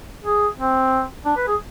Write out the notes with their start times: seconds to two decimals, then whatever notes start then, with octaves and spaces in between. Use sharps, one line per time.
0.24 G#4
0.57 C4
1.25 D4
1.36 B4
1.47 G#4